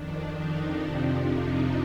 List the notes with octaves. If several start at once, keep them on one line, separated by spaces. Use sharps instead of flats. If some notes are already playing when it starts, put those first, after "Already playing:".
Already playing: F2 D#3 D4
D#4
F2 C3 F3 D4
D#4